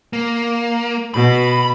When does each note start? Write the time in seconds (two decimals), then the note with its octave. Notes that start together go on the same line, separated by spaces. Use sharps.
0.13 A#3
1.14 B2 B5